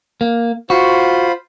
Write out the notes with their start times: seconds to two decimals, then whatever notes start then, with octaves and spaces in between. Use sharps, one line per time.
0.21 A#3
0.70 F4 F#4 C5 B5